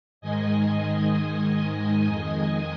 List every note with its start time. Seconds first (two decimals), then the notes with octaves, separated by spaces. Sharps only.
0.21 G#2 D#3 G#3 D#5 G#5
2.06 F2 D#3 G#3